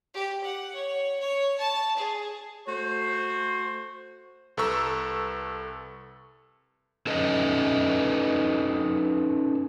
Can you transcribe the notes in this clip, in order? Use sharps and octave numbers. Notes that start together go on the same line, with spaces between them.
G4
F#5
C#5
C#5
A5
G#4
A3 F#4 C5
C2 A4 B4 A#5 C#6 E6
C#4 D#4 A4 B4 D#5